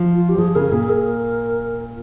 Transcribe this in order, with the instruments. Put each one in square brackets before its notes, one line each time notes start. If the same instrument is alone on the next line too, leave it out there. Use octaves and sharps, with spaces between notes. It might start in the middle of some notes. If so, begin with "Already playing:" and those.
Already playing: [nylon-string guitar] F3
[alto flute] F4
G4
[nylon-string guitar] F3 [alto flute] G#4
[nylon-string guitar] C#3 [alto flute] A#4
[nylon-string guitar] A#2 [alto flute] G#4
[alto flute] A#4